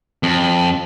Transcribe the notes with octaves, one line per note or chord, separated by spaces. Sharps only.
F2